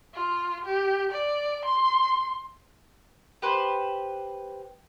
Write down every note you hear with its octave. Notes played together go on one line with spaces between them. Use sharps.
F4
G4
D5
C6
G4 B4 C5